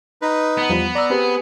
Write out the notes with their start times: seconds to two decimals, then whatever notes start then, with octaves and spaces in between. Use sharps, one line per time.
0.22 D#4 B4
0.57 B3
0.69 E2 F3 G3
0.95 D5 A#5 E6
1.10 C4 G4 G#4 B4